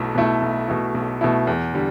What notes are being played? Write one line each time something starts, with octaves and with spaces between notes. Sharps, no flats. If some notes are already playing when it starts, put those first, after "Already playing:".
Already playing: B1 B2 A3 E4
B2 A3 E4
B1
B2 A3 E4
B1
B2 A3 E4
E2
D3 G3